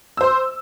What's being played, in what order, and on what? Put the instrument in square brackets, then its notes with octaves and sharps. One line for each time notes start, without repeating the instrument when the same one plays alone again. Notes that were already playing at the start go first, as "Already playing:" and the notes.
[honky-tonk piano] E6
C5
C6